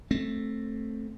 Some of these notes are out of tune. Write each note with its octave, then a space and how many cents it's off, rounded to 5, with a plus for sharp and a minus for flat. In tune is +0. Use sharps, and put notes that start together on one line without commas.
A3 +0 C4 +15